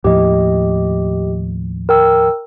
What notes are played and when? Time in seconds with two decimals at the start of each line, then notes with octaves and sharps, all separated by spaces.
0.04 D#2 A2 F3 G4 D#5
1.89 A#4 G5 E6